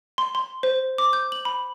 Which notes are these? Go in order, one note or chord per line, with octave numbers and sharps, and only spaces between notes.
C6
C6
C5
D6
G6
F#7
B5